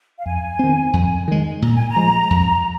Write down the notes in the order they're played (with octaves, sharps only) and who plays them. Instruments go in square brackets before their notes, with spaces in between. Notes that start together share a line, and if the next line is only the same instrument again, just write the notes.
[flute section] F5
[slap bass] F2 [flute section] G#5
[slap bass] D#3 C4
F2
D#3 G#3
[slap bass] A#2 [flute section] A#5
[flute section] G#5
A#5
[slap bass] F3 G#3
F2